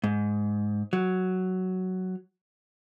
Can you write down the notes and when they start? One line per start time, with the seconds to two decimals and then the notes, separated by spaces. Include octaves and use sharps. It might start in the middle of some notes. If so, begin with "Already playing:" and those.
0.04 G#2
0.93 F#3